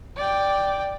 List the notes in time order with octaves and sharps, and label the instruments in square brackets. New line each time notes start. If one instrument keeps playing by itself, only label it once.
[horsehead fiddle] D5 G5